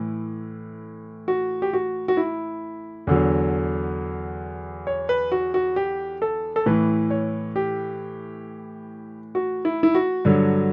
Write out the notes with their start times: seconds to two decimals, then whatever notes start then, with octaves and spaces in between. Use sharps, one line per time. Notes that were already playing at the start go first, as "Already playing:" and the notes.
Already playing: A2 E3
1.28 F#4
1.62 G4
1.73 F#4
2.08 F#4
2.17 E4
3.07 E2 D3 F#3
4.87 C#5
5.09 B4
5.32 F#4
5.54 F#4
5.76 G4
6.22 A4
6.56 A4
6.66 A2 E3 B4
7.10 C#5
7.56 G4
9.35 F#4
9.65 E4
9.83 E4
9.95 F#4
10.25 G2 D3 F#3